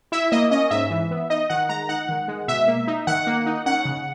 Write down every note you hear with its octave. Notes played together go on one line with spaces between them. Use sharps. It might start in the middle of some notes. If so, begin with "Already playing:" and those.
E4 E5
A#3 D#5
C#4 D#5
G#2 E5
E3
B3
D#4 D#5
D#3 F#5
G#3 A#5
D#4 F#5
D#3
G#3
B2 E5
A#3
D#4
D#3 F#5
A#3
D#4
C#4 F#5
C#3